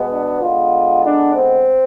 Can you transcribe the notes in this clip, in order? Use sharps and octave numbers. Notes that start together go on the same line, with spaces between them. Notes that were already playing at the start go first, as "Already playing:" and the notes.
Already playing: B2 G#3 B3
D4
D3 G#3 B3 F4
D4
C4